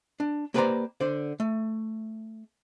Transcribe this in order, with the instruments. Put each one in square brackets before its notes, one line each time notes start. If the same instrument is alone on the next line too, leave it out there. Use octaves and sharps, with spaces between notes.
[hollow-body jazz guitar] D4
A#3 G4 B4 C5 D5 A#5
D3 C5 D5
A3